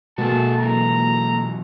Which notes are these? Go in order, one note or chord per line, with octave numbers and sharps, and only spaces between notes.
B2 G#3 A#3 F#4 G#4 A4 A5
F#2 E3 A#5